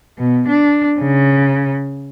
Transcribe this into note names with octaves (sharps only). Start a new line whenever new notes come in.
B2
D4
C#3